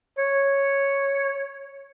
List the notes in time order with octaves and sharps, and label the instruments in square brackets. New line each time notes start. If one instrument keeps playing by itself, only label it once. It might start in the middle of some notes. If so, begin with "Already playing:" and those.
[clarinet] C#5